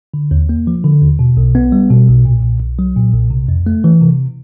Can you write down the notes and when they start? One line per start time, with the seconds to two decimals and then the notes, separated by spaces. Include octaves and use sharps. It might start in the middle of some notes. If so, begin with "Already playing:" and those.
0.14 D3
0.31 D#2
0.49 A#3
0.67 F3
0.84 D3
1.02 D#2
1.19 B2
1.37 B1
1.55 B3
1.72 G3
1.91 B2
2.07 B1
2.25 A#2
2.42 B1
2.61 B1
2.79 F#3
2.96 A#2
3.14 B1
3.30 C3
3.48 F2
3.66 A3
3.84 E3
4.01 C3